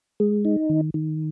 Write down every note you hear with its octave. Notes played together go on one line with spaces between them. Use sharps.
G#3
D#4
D#3
D#3